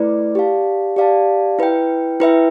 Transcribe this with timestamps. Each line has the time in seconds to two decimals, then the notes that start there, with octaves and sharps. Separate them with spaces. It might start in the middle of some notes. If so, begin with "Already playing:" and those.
Already playing: A3 E4 B4 D5
0.35 G4 D5 F5 A5
0.96 G4 D5 F5 A5
1.59 E4 B4 E5 G5
2.20 E4 B4 E5 G5